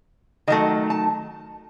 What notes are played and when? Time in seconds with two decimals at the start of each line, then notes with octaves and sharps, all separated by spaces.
0.47 D#3 F#3 A3 D#5
0.90 A5